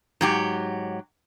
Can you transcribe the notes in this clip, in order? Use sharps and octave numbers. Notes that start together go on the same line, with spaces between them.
G#2 F#3 G4